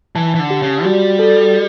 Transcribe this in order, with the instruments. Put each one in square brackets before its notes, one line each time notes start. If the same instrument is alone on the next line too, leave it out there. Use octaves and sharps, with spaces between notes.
[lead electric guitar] E3 [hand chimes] A5
[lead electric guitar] E3
D3
[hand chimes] G4
[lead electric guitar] C#3
[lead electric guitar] G3 [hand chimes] F#4
[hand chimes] A4